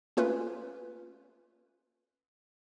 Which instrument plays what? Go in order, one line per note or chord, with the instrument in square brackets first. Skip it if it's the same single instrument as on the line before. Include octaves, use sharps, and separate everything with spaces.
[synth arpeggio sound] A3 A#3 C#4 F4 A4 B4